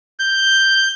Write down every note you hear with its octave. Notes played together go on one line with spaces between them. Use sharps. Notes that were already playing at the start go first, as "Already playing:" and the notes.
G6